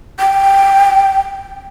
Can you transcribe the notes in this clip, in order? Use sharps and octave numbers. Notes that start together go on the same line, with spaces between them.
G5